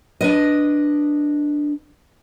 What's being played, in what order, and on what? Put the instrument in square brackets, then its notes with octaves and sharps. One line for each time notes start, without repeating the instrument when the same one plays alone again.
[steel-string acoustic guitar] D4 B4 D#5